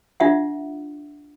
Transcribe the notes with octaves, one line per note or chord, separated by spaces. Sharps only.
D4 F4 E5 F#5